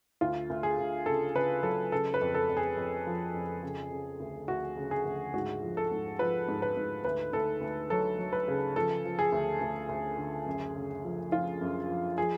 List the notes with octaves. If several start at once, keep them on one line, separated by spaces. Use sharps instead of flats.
D2 F4
D2
G#4
D2
C#3 A4
C#3 B4
F#3 A4
C#3 A4
B4
F2
A4
F2
G#4
F2
F3
F2
C#3
C#3
D2
D2 F#4
C#3
G#4
D2
G#2 F#4
F3
A4
G#2
F3 B4
G#2
B4
G#2
D2 B4
D2 A4
D2
F#3 A4
F#3
B4
C#3
F3 A4
F3
G#4
D2
D2
D2
D3
F#2
C#3
F3
F3 F4
F#2
F3
F3 G#4